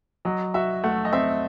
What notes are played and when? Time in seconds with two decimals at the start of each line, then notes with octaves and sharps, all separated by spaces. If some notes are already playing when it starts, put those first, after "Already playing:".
0.25 F#3 D#5
0.54 F#4 E5
0.84 A3 F#5
1.05 D#5
1.13 C4 E5